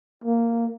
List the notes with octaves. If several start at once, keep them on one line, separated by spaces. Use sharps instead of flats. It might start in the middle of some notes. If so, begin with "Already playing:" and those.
A#3